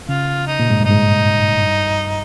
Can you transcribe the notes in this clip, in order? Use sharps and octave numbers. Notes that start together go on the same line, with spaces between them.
C#3 F4
D#4
A#2
G#2
G2
D#4
G#2
G2